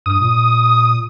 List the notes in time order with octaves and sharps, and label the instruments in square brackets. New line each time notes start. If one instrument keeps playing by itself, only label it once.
[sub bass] G2 [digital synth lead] D#6
[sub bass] A#2